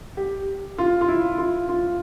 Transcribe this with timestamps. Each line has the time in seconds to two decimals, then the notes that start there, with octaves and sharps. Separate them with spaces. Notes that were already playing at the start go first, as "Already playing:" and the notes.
0.17 G4
0.78 F4
1.01 F4
1.08 E4
1.38 F4
1.69 F4